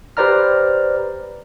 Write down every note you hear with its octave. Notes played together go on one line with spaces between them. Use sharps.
G4 B4 C5 D5 A#5 F6